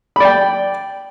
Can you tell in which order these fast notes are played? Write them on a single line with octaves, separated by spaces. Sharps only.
B5 D5 G5